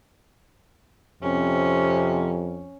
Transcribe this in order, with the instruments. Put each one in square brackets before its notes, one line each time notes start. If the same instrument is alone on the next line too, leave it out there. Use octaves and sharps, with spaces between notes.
[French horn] F2 [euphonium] C3 [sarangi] C#4